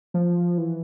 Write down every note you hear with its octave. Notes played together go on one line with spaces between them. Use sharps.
F3
E3